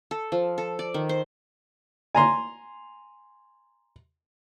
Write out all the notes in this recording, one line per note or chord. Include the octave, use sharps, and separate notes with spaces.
A4
F3
A4
D5
D#3
C5
G#5 A#5 C6